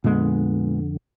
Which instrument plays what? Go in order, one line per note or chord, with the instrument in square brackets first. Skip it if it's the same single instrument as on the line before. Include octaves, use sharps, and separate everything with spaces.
[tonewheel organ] F2 D3 [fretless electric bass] A#2 G#3 B3